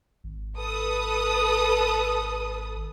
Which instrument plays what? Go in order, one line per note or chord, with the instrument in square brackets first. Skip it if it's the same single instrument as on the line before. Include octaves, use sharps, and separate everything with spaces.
[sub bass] G#1
[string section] A4 B4 D#6